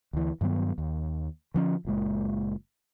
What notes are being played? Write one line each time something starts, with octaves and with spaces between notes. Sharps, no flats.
D2 E3
G2 D#3 F#3 B3
D#2
D3 F3 C#4
F#1 A#2 G#3